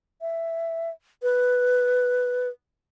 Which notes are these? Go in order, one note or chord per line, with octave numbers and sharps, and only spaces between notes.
E5
B4